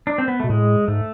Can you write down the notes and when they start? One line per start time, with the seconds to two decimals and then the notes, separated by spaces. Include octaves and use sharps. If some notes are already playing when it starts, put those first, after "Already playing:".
0.07 D4
0.18 C4
0.28 B3
0.40 B2 A3
0.50 A2 G#3
0.88 G#2 A3